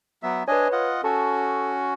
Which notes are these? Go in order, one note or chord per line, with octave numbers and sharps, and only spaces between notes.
F#3 B3 E5
D4 B4 C#5 D#5 G#5
F4 D#5 F#5
C#4 F#4 A4 A5 C#6